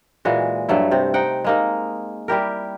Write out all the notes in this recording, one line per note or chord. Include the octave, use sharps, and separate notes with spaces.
A#2 E3 G#3 F#4
G2 F#3 A3 E4
C3 C4
C4 D#4 F#5 G5
G#3 A#3 D#4
G3 E4 G4 A#4